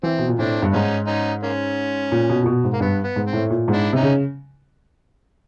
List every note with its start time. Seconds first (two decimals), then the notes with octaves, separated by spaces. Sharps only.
0.03 E3 C4
0.19 B2
0.28 A#2
0.39 A2 C4 D4
0.62 G2
0.72 G#2 C#4 D#4
1.07 C#4 D#4
1.43 A#3 C#4
2.12 A#2
2.30 B2
2.42 A#2
2.46 B2
2.64 G#2
2.73 A#3
2.80 G2 B3
3.04 B3
3.16 G#2
3.27 C4
3.33 A2
3.50 A#2
3.68 G#2
3.73 D4 E4
3.93 C3 C#4 D#4
4.03 C#3